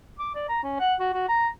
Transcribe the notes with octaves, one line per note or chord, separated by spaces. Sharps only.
D6
D5
A#5
C#4
F#5
F#4
F#4
A#5